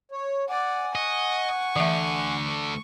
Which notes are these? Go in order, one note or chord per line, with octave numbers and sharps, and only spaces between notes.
C#5
D5 F#5 G#5
D#5 C#6
D3 E3 A3 E5